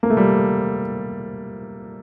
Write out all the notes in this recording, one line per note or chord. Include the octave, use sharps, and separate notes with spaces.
A#3
A3
G3